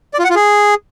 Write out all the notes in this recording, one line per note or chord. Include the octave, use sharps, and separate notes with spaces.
D5
F4
F#5
F4
G#4